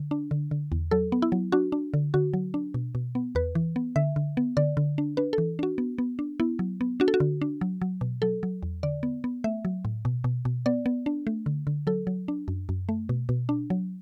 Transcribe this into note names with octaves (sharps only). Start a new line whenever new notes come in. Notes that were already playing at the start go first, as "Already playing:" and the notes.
Already playing: D3
D4
D3
D3
E2
F#3 A4
B3
E4
F#3
D4 F#4
D4
D3
D3 F#4
F#3
D4
B2
B2
B3
E2 B4
E3
B3
D3 E5
D3
B3
D3 D5
D3
D4
D4 B4
A4
E3
D4 F#4
B3
B3
D4
B3 E4
F#3
B3
D4 F#4
A4
F#4
D3
D4
F#3
F#3
B2
F#3 A4
F#3
E2
D3 D5
B3
B3
A3 E5
F#3
A2
B2
B2
B2
B3 D5
B3
D4
A3
D3
D3
F#3 A4
F#3
D4
F#2
F#2
A3
B2
B2
D4
F#3